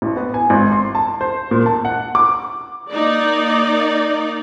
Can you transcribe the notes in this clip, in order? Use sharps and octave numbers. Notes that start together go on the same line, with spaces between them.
A1
B3
G#5
G#1
C6
A5
C5
A#2
A5
F#5
D6
A#3 D#4 D5